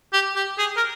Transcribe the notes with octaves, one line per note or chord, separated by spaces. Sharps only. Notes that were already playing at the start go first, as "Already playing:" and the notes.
G4
G4
G#4
A#4